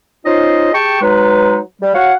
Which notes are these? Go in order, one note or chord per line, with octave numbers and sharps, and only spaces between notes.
C#4 D#4 F4 C5 D#5
G4 G#4 G5 A5 C#6
F#3 G#3 D#4 B4
G3
F#4 C#5 F5 F#5